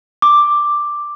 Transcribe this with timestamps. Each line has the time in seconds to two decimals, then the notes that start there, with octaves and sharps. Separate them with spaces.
0.22 D6